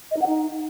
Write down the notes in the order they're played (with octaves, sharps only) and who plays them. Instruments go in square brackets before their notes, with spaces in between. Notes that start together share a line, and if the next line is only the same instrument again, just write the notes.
[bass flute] D#5
D#4
F#5
D#4